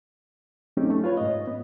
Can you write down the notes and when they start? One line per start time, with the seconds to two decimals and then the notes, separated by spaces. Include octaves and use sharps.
0.77 F#3 A3 C4 C#4 D#4 G4
0.90 A3
1.04 F4 B4 C#5
1.17 G#2 D#5
1.48 B3